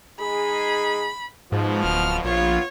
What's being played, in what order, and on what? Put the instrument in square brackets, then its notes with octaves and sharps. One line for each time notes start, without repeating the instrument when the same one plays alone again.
[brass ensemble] G#3 D#4 G#4 [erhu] B5
[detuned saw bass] G#2 [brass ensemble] B2 F3
[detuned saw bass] D1 [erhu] F6
[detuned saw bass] A#1 [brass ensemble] B3 F4 [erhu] C#5